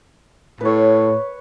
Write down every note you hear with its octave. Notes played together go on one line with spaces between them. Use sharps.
A2 B4 C#5